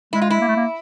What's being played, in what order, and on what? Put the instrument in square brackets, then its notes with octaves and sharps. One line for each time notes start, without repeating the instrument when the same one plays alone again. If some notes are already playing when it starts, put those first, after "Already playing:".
[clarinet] G#3 [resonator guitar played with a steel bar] E4
[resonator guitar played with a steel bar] F4
E4
[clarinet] A#3
A3
A#3